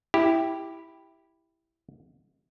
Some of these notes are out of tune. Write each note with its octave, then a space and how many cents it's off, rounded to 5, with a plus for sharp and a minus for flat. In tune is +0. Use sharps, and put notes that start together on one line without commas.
E4 +0 G4 +0